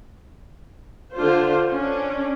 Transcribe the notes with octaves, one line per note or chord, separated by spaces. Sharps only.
D3 D4 F4 C5
C#4 D4